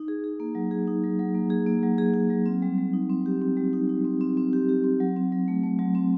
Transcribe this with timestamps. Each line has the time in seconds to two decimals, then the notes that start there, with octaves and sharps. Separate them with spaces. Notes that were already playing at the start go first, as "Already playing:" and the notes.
Already playing: D#4
0.08 G#4
0.24 G#4
0.40 A#3
0.55 F#3
0.71 G#4
0.87 D#4
1.04 F#3
1.19 F#3
1.35 A#3
1.50 G#4
1.67 A#3
1.83 F#3
1.98 G#4
2.14 G#4
2.30 F#3
2.46 C4
2.62 G3
2.78 G3
2.94 D#4
3.10 C4
3.26 G4
3.42 C4
3.57 G3
3.73 D#4
3.89 D#4
4.05 C4
4.21 C4
4.37 C4
4.53 G4
4.69 G4
4.84 C4
5.00 F#3
5.16 C4
5.32 F#3
5.48 A3
5.63 A3
5.79 F#3
5.95 C4